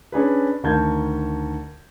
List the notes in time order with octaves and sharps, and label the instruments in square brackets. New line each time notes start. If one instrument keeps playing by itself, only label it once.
[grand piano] C#4 D4 G#4 B4
D2 D#3 A#4 A5 G6 G#6